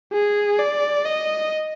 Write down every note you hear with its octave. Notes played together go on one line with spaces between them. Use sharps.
G#4
D5
D#5